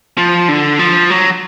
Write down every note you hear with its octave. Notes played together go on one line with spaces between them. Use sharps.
F3
D3
F3
F#3